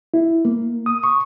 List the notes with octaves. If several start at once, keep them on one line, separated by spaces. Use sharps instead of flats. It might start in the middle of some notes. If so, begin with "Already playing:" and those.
E4
A#3
D#6
C#6